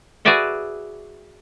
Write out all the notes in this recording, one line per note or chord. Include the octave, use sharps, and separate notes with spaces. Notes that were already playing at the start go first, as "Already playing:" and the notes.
F#4 G#4 B4 D5 E5 F#5